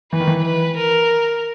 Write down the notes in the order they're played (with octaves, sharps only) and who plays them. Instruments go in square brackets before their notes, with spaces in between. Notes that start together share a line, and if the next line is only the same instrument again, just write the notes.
[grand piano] E3 [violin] B4
[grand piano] D#3
E3
[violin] B4
A#4